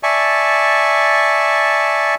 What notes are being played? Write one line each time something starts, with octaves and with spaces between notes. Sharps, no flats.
D5 E5 G#5 A5 C#6